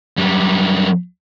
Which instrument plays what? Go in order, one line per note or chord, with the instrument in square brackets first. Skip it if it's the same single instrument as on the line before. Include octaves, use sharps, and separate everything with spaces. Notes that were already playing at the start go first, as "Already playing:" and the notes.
[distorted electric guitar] F#2 G3